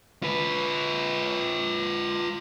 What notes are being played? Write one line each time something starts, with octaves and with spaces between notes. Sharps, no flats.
F4 B4